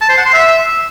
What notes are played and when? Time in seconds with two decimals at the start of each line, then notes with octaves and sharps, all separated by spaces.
0.01 A5
0.09 C5
0.17 F#5
0.26 C6
0.34 E5